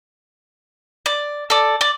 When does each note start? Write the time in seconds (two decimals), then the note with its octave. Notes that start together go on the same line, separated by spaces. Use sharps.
1.06 D5
1.50 A4 D5
1.81 D5